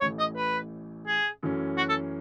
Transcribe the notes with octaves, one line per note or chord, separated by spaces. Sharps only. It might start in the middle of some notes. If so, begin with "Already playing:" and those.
A1 A2 E3 C#5
D#5
B4
G#4
F#2 E3 A3 C#4
F#4
A4